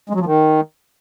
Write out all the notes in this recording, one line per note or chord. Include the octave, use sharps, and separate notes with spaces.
G#3
F#3
F3
D#3